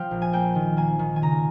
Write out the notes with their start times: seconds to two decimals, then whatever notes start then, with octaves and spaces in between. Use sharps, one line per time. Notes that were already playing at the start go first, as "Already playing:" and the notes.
Already playing: F3 C4 F5 G5
0.11 A#1
0.22 G#5
0.33 A#3 G5
0.55 D#3
0.77 A#3 G#5
0.99 D#3
1.16 G#5
1.22 C#3 A#5